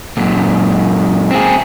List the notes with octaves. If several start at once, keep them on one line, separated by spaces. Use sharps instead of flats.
F#2 A#2
C4 G#4